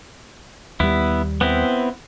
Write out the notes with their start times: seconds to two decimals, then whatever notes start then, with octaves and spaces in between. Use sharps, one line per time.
0.80 D#2 G3 B3 E4
1.41 B3 C4 E4